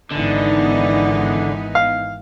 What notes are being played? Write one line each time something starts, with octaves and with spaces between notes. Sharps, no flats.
G#1 D3 E3 B3 D#4
F5